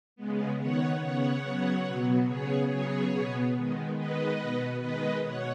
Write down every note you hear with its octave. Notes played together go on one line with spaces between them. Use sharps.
C#3 G#3 B3
D#3 B3 C#5 F#5
C#3 B3 C#5 F#5
C#3 F#3 B3
B2 F#3 B3
C#3 B3 G#4 C#5
C#3 F#3 B3 G#4 C#5
B2 B3
D#3 G#3 B3
D#3 G#3 B3 B4 D#5
B2 B3
D#3 G#3 B3 B4 D#5
B2 C#5 F#5